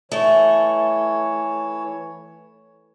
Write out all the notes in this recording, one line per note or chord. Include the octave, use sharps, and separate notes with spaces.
E3 A3 C#5